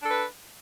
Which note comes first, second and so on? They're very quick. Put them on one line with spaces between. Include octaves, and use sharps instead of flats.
D4 A4 B4